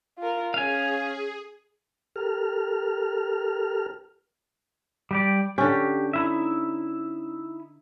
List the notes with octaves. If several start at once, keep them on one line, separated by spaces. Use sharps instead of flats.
F4 A#4
C#4 G#4 F5 G#5
G4 A4 A#4 F6
G3 G4 D5
D3 C#4 G4
D#4 E4 E5